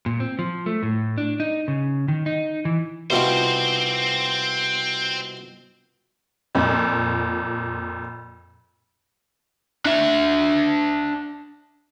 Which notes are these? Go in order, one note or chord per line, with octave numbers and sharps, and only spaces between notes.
A#2
C4
F3
A3
A2
D4
D#4
C#3
D#3
D#4
E3
C2 B2 F3 C4 C5
F2 A#2
D4 E5